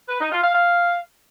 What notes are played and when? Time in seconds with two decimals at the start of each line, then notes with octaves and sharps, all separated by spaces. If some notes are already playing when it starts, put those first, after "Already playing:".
0.09 B4
0.20 D#4
0.31 F4
0.43 F5
0.54 F5